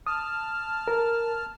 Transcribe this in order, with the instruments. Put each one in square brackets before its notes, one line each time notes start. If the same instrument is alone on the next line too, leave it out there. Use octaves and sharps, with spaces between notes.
[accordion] A5 F6 [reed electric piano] D#6
[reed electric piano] A#4